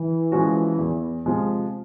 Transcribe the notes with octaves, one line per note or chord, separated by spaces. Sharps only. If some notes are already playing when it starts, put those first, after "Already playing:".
Already playing: E3
F3 G#3 C#4 F#4
E2
C3 F3 G#3